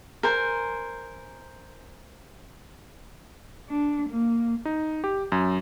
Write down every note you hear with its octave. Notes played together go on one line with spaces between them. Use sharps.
A#4 C5 G#5
D4
A#3
D#4
G4
F#2